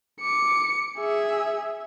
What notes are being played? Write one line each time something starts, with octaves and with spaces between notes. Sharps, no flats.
D6 C#7
G#4 E5